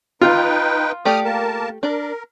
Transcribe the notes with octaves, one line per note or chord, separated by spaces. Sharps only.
D#4 F4 B4 G5
A3 G4 D5 D#6 F6
A#3 A#4 A5
D4 A#4 D5